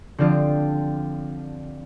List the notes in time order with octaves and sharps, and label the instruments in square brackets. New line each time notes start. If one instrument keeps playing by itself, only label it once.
[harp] D3 F3 C4 D4 F4 G4